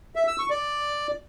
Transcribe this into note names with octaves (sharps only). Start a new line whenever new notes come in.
E5
E6
C#6
D5